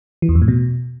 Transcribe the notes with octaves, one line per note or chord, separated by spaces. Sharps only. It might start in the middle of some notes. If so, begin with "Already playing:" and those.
E3
E2
F2
A2
B2